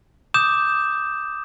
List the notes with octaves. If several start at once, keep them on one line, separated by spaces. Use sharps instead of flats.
D6 D#6 G6 E7